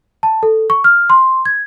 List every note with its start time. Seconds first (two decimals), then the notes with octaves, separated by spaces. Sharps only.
0.23 A5
0.43 A4
0.70 C#6
0.84 F6
1.10 C6
1.46 G#6